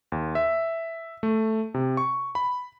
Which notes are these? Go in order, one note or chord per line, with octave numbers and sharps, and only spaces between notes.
D#2
E5
A3
C3
C#6
B5